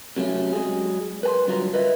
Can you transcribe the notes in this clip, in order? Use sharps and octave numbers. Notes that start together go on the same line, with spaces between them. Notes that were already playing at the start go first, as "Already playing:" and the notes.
C3 F#3 A3 C#4
F#3 G#3 G#4
B4 G#5 C6
G2 D3 F#3 F4 G#4 A#5
B4 D#5 E5